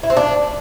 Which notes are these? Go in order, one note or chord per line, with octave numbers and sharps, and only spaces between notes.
E4
C4
D4